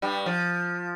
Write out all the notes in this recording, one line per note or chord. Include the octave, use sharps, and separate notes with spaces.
G2 G3
F3